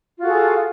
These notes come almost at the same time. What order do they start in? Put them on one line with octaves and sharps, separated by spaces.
F4 F#4 A4 G#4